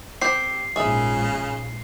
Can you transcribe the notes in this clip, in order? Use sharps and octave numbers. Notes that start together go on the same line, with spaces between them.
C4 G4 C7
A#1 G#2 C#3 G#3 G#4 E5